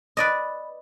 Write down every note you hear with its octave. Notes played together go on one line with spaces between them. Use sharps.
B4 D5 D#5